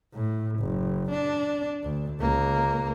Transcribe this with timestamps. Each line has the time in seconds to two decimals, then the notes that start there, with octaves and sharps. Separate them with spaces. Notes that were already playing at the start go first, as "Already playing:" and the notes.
0.14 A2
0.60 F#1
1.11 D4
1.84 D2
2.20 C#2 A#3